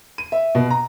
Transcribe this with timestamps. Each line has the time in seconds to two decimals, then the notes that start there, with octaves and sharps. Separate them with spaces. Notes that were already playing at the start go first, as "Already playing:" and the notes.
0.18 D#7
0.32 E5
0.55 B2
0.70 A#5